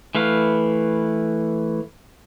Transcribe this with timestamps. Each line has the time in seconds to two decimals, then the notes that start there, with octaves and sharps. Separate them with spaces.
0.15 E3 A3 B4 F5